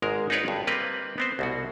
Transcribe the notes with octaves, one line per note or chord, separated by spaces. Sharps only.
G#1 G#2 G#3 A#4
D#4 F4 G#4 B4 C#5 D5
G1 G2
G3 A#3 C4 A#4 B4 D#5
B3 C4 C5
C2 B2 F#4